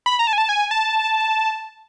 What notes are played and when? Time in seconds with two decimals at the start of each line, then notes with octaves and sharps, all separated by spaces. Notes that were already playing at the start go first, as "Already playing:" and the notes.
0.06 B5
0.19 A#5
0.27 A5
0.33 G#5
0.38 A5
0.49 G#5
0.71 A5